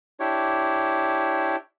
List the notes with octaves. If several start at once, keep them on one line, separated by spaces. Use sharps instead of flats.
D4 E4 G4 C#5